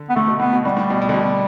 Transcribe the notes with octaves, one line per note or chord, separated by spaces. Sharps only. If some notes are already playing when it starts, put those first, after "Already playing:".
Already playing: D3
B3
D3 A3
B2
A2 B3
B2
A2 G3
A2
B2
B2
D3
B2